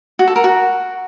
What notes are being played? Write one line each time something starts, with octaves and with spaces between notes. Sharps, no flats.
F#4
A4
A#4
F#4